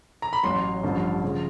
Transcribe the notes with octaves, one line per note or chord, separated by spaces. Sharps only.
A#5
B5
A1 A2 F#3 C6
A1 G2 D3 F3
C#3 F3